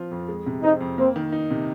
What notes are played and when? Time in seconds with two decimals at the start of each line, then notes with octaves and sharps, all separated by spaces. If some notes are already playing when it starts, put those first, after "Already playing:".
Already playing: F3 C4 F4
0.11 F2
0.28 G#3
0.46 C3
0.63 C4 D#4
0.81 F2
0.98 A#3 C4
1.16 D#3
1.32 D#4
1.50 C3